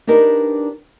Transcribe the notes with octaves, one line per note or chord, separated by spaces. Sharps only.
D4 D#4 G4 A#4 B4 D5